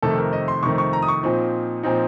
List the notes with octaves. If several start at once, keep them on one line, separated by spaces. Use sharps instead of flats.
F2 C3 D#3 A3 A4
A#4
D#5
C6
F2 C3 D#3 A3 C#6
C#6
A#5
D#6
C#6
A#2 F3 C4 D#4
A#2 F3 C4 D#4